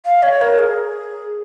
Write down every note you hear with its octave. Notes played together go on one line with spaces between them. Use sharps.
F5
C#5
A#4
G#4